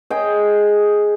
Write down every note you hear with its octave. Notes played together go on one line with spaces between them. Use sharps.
G#4 D#5 G5